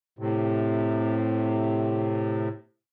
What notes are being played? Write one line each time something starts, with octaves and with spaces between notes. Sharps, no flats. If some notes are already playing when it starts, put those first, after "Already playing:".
A2 C3